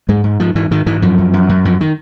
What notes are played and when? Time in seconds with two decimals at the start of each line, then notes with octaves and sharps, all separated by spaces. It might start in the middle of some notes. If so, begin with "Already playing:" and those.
0.09 G#2 G#3
0.24 G#2
0.40 G#2 F3
0.55 G#2 E3
0.71 G#2 D#3
0.86 G#2 E3
1.02 F#2 F3
1.18 F#2
1.33 F#2
1.49 F#2
1.65 F#2 F3
1.81 D#3